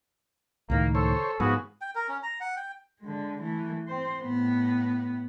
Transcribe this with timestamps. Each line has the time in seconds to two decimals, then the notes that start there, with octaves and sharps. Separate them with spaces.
0.70 C#2 A2 D#3 A#3
0.95 A4 C5 C#5
1.40 G#2 F3 B3 F#4 G#4
1.81 G5
1.95 A#4
2.08 C#4
2.23 A#5
2.40 F#5
2.57 G5
3.01 D3 G#3
3.41 E3 A3
3.88 C4 C5
4.22 A2 B3